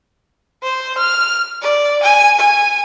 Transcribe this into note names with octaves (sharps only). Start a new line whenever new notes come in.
C5
F6
D5
G#5
G#5